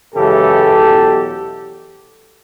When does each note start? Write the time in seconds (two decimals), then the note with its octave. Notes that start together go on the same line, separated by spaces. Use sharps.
0.15 F#2 C#3 E3 G#3 G4 A4
0.75 E2 B2 F#3